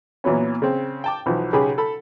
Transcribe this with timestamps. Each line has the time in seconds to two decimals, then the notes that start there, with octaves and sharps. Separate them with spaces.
0.24 A#2 E3 F#3 B3 C#4
0.62 C#3 C4
1.04 G5 A5 D6
1.26 B1 E3 F3
1.53 B1 C#3 C#4 G4 G#4 B5
1.78 A4 B5